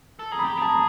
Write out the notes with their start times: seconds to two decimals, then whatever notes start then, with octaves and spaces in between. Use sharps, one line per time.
0.19 A4
0.32 G#4 A#5
0.39 B5
0.44 G4
0.57 G#4
0.62 A5
0.69 A#5